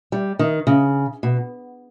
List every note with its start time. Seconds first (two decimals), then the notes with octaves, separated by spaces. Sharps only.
0.12 G3
0.39 D#3
0.67 C#3
1.23 B2